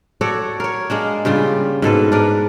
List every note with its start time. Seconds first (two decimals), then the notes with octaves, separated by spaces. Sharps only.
0.21 F#4 A4 C#5 D5
0.60 A#4 C#5
0.90 G#3 A#3 D4
1.25 G2 C#3 G3 F4
1.82 G#2 B2 A4 B4
2.12 D4 A#4 B4